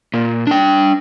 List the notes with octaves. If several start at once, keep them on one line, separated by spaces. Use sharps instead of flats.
A#2
D4 G5